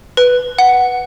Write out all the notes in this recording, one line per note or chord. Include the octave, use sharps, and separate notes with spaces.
B4
F#5